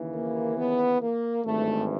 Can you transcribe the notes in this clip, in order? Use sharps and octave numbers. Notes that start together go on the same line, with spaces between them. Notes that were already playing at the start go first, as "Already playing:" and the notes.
Already playing: D#2 C#3 E3
A#3
B3
A#3
G#1 G2 E3 A3